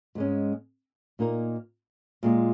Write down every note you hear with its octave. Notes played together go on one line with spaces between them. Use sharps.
G#2 G#3 C#4
A#2 A#3 D#4 A#4
A#2 G#3 F4